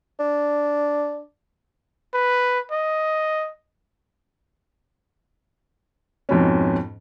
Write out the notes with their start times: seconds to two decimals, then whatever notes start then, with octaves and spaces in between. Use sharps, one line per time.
0.19 D4
2.14 B4
2.72 D#5
6.29 F2 G#2 B2 C#4